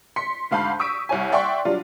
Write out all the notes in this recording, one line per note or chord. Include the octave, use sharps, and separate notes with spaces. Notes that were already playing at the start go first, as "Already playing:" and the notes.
C6 B6 C#7
D2 G#2 F5 A5 B5 G6
C#6 D#6 E6 B6 D7
C2 C#5 G#5
D5 E5 F#5 G5 C6 C#6
F#3 G3 D4 F4